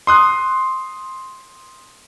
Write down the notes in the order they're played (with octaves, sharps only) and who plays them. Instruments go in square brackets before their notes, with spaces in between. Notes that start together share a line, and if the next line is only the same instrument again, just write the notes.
[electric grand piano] C6 D#6 F#6